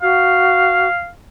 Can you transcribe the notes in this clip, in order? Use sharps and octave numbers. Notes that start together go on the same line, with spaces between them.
F#4 F5